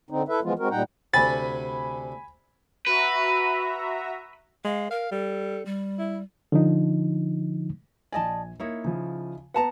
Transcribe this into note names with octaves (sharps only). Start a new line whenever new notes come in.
D3 C4 D#4
E4 A4 B4 E5
E3 F3 G#3 B3 F4
G#3 C4 F#4 A#4
A#2 G3 D#4 F#5 G5 A#5
D2 C3 G#5 B5 A6
F#4 B4 E5 A#5
G#3 F5
A#4 F5
G3 A4
G3
E4
D3 F3 D#4
A#1 D5 D#5 G#5 A5
A#3 D#4 E4 C#5
C#3 F3
B3 B4 F#5 A5 A#5